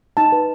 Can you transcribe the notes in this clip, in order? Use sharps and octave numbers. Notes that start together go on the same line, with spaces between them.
D#4 A5
B4